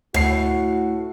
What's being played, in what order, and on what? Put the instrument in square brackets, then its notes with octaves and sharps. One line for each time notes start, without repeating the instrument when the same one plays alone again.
[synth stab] D2 [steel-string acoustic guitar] A2 [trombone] F#4 [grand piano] F#5 C7